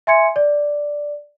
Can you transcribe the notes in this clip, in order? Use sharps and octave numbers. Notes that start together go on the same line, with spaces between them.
E5 G#5 C6 G#6 C#7
D5